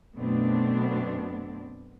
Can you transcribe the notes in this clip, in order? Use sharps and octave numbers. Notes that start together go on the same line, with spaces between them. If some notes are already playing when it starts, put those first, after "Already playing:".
F#2 B2 A3 B3 C4 D4